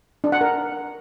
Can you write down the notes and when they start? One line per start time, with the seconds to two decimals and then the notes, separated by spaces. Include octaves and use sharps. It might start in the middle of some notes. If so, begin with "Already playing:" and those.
0.24 D4
0.32 F#5
0.41 A#4